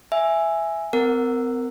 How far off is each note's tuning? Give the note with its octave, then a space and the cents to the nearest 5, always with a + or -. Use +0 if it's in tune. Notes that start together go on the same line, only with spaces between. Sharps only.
E5 +5 G#5 +0
C4 -40 A#4 -10 F#5 +0